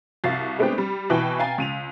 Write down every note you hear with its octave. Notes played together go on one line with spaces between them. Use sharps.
C2 F#4 F5 A6
G#3 A3 B3 C4 D4 G4
G3
B2 E3 F#4 B4 G5
F5 G5 G#5 A#5 A6
C#2 D#7 F7